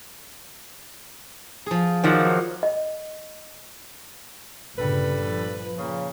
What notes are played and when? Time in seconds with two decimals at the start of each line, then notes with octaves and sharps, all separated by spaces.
1.66 F3 G#4
2.04 D#3 F3 F#3 D5 E5 F#5
2.63 D#5
4.78 G1 A#2 C#3 G3 D4 A4 B4
5.22 F3
5.78 A#2 C#3